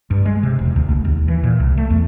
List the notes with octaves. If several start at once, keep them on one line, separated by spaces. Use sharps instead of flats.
G2
G#3
C3
E1
D2
C#2
D#2
E3
A#2
C2
A3
E2